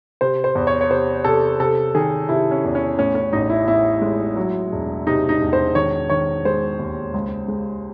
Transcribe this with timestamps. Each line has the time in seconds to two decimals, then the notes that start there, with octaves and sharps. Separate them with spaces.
0.21 C3 C5
0.44 C5
0.55 E2
0.67 C#5
0.81 C#5
0.90 C3 C5
1.25 C3 A4
1.60 C3 A4
1.95 D#3 G#4
2.29 C3 E4
2.51 C#4
2.64 E2
2.75 C#4
2.98 A2 C#4
3.15 C#4
3.33 A1 D#4
3.50 E4
3.68 A2 E4
4.02 G#3
4.36 F#3
4.72 E1
5.07 C3 D#4
5.29 D#4
5.41 E1
5.53 C5
5.75 D#3 C#5
6.10 D#3 C#5
6.45 G#3 C5
6.79 D#2
7.14 C#2
7.48 G#3